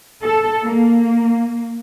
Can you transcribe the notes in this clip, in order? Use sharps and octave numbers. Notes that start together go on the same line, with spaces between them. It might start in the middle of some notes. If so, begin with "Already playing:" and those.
A4
A#3